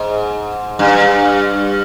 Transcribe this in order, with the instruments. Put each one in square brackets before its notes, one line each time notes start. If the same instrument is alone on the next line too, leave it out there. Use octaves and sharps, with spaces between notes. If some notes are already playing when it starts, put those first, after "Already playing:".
Already playing: [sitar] G#2
G2